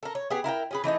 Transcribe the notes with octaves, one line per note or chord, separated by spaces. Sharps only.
A4 A#4
C#5
B3 G4 G#4
E4 A#4 F5 G5
C#4 G#4 B4
E3 A3 D#4 D#5